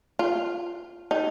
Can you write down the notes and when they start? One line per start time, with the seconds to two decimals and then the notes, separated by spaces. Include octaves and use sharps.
0.19 F4
1.11 D#4